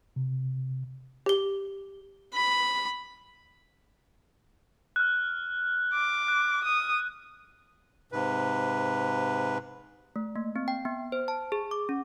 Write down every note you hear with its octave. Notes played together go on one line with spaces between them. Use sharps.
C3
G4 G7
B5
F6 F#6
D6
F#6
D#6
G#2 C3 B4
A3
A#3
C4
G5
B3
C5
A5
G#4
D6
C#4